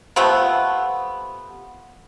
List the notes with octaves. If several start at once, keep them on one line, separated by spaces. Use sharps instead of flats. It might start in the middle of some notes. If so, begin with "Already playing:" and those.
C3 F3 A3 B3